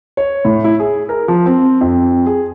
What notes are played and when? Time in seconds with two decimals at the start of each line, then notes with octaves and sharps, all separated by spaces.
0.17 C#5
0.45 A2
0.64 E4
0.80 G#4
1.09 A#4
1.28 F3
1.46 C4
1.81 F2
2.26 G#4